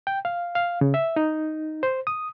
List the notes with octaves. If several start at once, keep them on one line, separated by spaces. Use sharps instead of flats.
G5
F5
F5
C#3
E5
D#4
C5
D#6